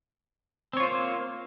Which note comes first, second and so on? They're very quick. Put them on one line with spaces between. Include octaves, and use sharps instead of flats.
C4 C#5 F4 C5 A#3